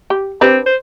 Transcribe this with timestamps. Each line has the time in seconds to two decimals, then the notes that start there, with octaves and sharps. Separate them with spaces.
0.10 G4
0.41 C4 D4 G4 B4
0.66 C5